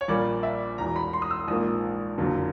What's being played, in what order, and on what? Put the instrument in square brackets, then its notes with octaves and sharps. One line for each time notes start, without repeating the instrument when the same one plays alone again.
[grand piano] C#5
A#1 A#2 G3 A#3 D5
E5
E1 E2 B2 A#5
B5
C6
D#6
E6
A#1 G#2 F3 A#3 D#6
F#1 F2 D3 F#3 A#3